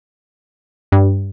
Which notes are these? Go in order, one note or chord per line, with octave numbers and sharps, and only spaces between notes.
G2